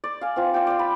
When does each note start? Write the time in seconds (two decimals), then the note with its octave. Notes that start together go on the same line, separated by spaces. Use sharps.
0.04 D5
0.21 F5 G#5
0.36 C4 F4
0.54 D5 F5 G5
0.67 D5 F5
0.79 B5